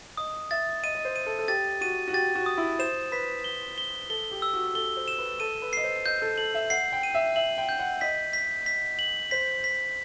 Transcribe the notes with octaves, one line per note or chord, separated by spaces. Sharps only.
D#5 D#6
E5 A6
D#5 D#7
D#5
C5
D#7
A4
A4
G4 A6
F#4 D#7
F#4
G4 A6
F#4
D#6
E4
C5 E7
B4 B6
G7
G7
A4 G7
G4
E6
F#4
A4 G7
C5
E7
B4
A4 D#7
B4
D#5 C7
C5
D#5 G6
A4
A4 F#7
E5
F#5 C7
G5
D#7
E5
E5 F#7
G5
G6
F#5
D#5 B6
B6
B6
F#7
C5 B6
B6